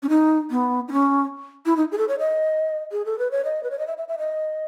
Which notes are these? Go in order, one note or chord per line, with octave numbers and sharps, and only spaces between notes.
C#4
D#4
B3
D#4
C#4
E4
D#4
G#4
A4
C#5
D#5
G#4
A4
B4
C#5
D#5
B4
C#5
D#5
E5
E5
E5
D#5